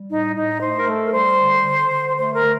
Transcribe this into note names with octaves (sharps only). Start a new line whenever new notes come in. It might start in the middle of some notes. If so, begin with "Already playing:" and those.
Already playing: G3
A2 D#4
A2 D#4
A3 C5
A#4
A3 A4
A#4
G3 C5
D3
D3
D3
A3 C5
A#4
A3